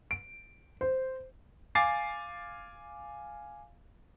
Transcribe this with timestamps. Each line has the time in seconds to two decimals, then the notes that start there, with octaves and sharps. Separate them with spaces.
0.11 D7
0.81 C5
1.75 F5 G#5 D6 A6 C7